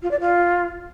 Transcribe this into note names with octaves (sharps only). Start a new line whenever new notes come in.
F4
D5
F4